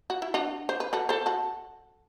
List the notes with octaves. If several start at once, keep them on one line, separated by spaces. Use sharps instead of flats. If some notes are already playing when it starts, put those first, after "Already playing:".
F#4
E4
D4 F#4
C5
B4
F#4 A4
A4 C5
F#4 A4